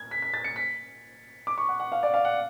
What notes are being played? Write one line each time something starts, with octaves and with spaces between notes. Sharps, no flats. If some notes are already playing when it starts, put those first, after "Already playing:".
Already playing: G#6
B6
B6
A6
C#7
B6
D6
C#6
F#5
F#5
F5
D5
F5
F#5